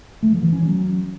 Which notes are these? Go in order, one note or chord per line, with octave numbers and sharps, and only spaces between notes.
A3
F3
E3
C#4
F#3